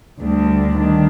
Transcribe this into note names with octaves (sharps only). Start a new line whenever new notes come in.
D2 D3 G3 D4
D#3 G3 D4